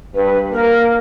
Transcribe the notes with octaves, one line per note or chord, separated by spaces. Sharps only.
G2 B4
A#3 A#4